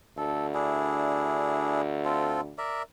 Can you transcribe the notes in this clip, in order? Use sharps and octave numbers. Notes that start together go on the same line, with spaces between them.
D2 A4
D4 E4 G#4
C4 F4 A4
A#4 D5 E5